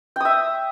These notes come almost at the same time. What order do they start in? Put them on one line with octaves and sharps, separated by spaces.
G5 D#6 E5